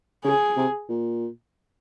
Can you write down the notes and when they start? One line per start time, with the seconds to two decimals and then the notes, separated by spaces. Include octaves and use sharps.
0.24 C#3 G#4
0.57 C3
0.89 A#2